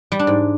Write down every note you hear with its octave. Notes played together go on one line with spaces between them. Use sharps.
G3
D4
G#2